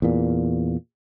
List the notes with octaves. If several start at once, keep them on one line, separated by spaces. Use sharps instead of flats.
E2 A#2